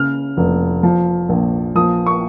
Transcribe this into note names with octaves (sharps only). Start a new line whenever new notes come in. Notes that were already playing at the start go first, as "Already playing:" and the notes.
Already playing: C#3 F6
F1
F3
A#1
F3 D#6
C#6